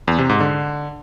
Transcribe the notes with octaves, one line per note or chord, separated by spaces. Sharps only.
E2
C3
G#2
D3